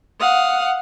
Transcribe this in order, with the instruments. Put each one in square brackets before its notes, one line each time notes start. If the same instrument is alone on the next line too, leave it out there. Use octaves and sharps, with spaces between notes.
[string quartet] F5 F#5 D#6